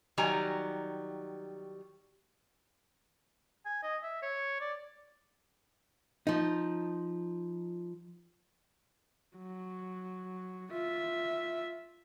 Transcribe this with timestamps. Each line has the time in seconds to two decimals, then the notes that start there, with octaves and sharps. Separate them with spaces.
0.18 D#3 F#3 G3 G#5 A#5
3.65 G#5
3.83 D#5
4.03 E5
4.22 C#5
4.60 D5
6.27 F3 D#4
9.37 F#3
10.72 F4 E5